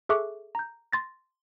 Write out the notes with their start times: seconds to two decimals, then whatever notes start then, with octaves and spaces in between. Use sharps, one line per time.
0.09 G#4 A4 E5 C#6 D6 F#6
0.55 A#5 G6
0.93 C6 A6 A#6